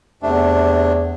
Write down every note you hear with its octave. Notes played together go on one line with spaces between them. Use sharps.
E2 C3 A3 D4